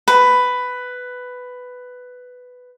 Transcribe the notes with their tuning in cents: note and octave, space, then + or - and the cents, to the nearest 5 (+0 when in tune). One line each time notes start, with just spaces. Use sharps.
B4 +10